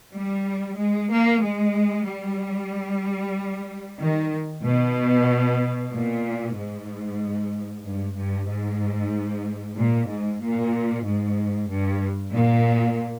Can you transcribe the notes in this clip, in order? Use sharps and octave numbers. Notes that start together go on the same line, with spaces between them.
G3
G#3
A#3
G#3
G3
D#3
B2
A#2
G#2
G2
G2
G#2
A#2
G#2
A#2
G#2
G2
A#2